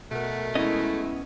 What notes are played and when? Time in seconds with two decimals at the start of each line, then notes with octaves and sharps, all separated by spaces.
0.11 B2 A3 A#4 F#5
0.55 G#3 B3 C#4 E4 D#5